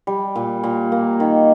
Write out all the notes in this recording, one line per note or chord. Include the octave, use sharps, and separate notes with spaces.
G3
A#2
A#2
A#3
D#3